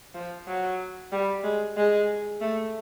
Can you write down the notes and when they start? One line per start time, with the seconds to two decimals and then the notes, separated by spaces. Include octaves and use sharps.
0.15 F3
0.47 F#3
1.12 G3
1.44 G#3
1.77 G#3
2.41 A3